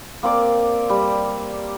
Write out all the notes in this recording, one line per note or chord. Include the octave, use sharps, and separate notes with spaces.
A#3 C4 D5 D6
G3